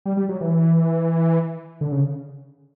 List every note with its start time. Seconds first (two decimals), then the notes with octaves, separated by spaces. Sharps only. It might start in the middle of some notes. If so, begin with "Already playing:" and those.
0.06 G3
0.17 G3
0.29 F#3
0.41 E3
1.81 D3
1.92 C#3